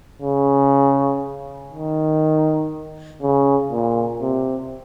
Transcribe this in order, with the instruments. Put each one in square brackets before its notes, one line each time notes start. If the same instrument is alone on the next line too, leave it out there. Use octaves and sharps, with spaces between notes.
[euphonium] C#3
D#3
C#3
A#2
C3